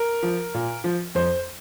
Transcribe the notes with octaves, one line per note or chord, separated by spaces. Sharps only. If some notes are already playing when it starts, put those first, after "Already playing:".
Already playing: A#4
F3
A#2
F3
F2 C5